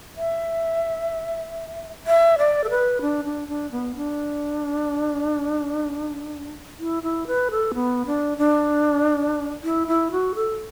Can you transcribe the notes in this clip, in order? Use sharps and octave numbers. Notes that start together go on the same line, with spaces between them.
E5
E5
D5
A4
B4
D4
D4
D4
B3
D4
E4
E4
B4
A4
B3
D4
D4
E4
E4
F#4
A4